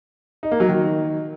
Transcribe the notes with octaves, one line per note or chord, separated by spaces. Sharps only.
D#4
A#3
F#3
D#3